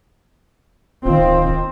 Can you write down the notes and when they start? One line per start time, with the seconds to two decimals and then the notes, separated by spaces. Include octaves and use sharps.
1.06 D1 D#3 C4 F4